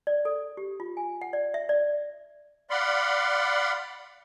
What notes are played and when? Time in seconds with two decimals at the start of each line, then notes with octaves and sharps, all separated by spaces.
0.07 D5
0.25 A4
0.57 G4
0.80 F4
0.97 G#5
1.21 F#5
1.33 D5
1.54 E5
1.69 D5
2.70 D5 F5 F#5 B5 C6